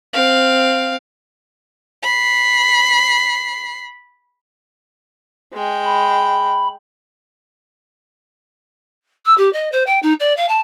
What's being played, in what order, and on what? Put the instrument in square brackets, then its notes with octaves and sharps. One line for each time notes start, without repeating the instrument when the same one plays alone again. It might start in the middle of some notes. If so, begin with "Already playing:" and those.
[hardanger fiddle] C4 F5
[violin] B5 C7
[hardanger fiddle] G#3 G5
[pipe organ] B5
[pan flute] E6
G4
D#5
C5
G5
D#4
D5
F5
A5